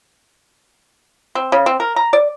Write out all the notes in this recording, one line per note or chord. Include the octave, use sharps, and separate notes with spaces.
C4
C#3
C4
A#4
A#5
D5